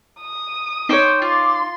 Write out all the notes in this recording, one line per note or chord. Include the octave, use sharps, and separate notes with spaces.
D#6
D#4 C5 C#5 G5 D6
F4 C6 D6